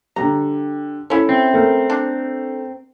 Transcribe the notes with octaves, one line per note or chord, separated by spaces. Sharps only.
D3 G3 A#5
C#4 E4 A4
C4
A3 A#4
D4